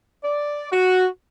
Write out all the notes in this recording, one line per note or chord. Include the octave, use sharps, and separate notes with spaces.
D5
F#4